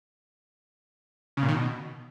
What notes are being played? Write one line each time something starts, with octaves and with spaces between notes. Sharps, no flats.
C#3
A#2
D#3
B2